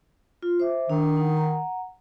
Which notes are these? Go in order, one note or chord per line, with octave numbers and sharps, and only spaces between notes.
F4
C5 E5 D6
D#3 D4
D#4 F#5
F#5 A#5